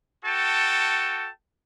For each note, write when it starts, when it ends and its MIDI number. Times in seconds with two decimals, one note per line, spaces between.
0.24 1.28 66
0.24 1.28 69
0.24 1.28 79
0.24 1.28 81